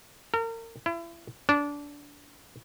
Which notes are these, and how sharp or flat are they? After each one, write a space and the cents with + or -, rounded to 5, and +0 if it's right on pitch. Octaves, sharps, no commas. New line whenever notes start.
A#4 -35
E4 +35
D4 -20